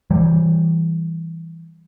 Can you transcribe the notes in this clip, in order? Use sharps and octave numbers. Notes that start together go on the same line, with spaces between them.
E3 G3